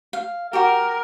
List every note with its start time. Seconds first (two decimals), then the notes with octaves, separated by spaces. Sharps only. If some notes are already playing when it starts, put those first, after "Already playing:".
0.13 F5
0.53 F#4 G4 A#4